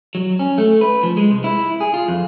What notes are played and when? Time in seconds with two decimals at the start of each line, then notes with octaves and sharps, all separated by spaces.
0.15 F#3
0.39 C#4
0.58 A3
0.81 B4
1.03 F3
1.17 G#3
1.30 C2
1.44 E4
1.81 G#4
1.94 F4
2.08 F2